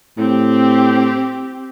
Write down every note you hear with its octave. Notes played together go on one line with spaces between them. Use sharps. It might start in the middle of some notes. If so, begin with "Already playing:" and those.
A2 C4 G4